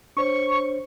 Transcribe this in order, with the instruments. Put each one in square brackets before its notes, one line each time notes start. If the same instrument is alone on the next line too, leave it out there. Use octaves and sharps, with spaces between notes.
[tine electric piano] D4 C5 C#5 [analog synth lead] C#6